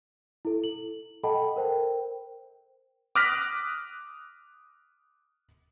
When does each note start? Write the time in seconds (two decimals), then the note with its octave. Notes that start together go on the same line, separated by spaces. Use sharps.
0.45 E4 A4
0.64 F#7
1.23 A4 D#5 F#5 G5 A5 B5
1.56 A#4 C5 G5
3.15 D6 D#6 F6 F#6 A#6 B6